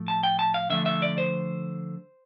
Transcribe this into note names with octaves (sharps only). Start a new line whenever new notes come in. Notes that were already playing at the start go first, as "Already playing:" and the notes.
Already playing: A2 F3 A3
A5
G5
A5
F5
D3 F3 A3 E5
E5
D5
C5